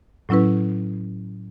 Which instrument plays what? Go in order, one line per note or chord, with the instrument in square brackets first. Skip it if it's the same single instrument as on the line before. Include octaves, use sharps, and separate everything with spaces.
[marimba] A2 F#3 C#4 E4 B4